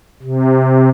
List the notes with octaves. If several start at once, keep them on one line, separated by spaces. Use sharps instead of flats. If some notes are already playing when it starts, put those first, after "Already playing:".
C3